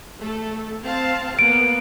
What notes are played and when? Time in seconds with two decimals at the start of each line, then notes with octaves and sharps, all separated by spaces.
0.20 A3 A4
0.83 C4 F5 A5
1.39 A#3 B3 D7